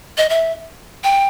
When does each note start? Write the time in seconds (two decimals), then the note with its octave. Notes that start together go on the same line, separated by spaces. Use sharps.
0.18 D#5
0.29 E5
1.04 G5